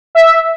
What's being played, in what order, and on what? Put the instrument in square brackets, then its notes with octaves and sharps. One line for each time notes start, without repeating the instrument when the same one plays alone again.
[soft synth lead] E5